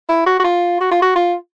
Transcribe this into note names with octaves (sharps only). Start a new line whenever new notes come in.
E4
F#4
F#4
F4
F#4
F4
F#4
F4